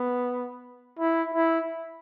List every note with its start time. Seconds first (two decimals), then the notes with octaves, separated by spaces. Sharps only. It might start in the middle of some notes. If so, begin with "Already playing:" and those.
Already playing: B3
0.99 E4
1.34 E4